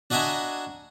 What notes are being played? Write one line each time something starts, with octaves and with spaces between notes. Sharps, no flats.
D4 F#4 D#5 E5 G#5 A#5